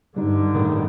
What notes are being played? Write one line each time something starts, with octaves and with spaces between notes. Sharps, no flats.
G2 D3 G3 D#4
A2 D#3